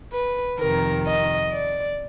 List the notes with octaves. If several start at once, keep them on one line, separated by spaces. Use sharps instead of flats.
B4
F2 C3 D#3 A#4
D#5
D5